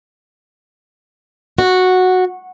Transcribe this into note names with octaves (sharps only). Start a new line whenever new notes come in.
F#4